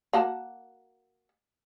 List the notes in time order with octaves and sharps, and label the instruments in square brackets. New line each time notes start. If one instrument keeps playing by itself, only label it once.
[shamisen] A#3 F#4 A5